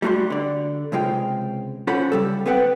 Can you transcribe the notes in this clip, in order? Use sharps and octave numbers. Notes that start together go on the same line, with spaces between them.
G3 A3 F#4 A#5 C6
D3 D5
C#2 C3 G#3 F4 G5
C#4 F4 A4 C5 F#5 B5
C#3 G3 A4
B3 C4 B4 F#5 G5